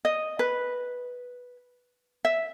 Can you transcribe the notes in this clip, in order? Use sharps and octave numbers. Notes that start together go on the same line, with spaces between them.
D#5
B4
E5